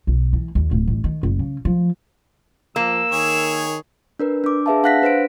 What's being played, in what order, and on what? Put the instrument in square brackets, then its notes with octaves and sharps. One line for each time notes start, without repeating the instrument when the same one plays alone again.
[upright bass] B1
E3
D#2
D1
A1
D#3
F#1
C#3
F3
[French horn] F3 [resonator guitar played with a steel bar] A#3 [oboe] E6
[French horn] D#3 [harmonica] G#4 C#5
[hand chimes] D4 A#4 B4
D4 D6
D4 G#4 B4 E5 F5 A5
D4 F5 F#5 F#6 A#6 B6
D4 B4 C5 B6 D7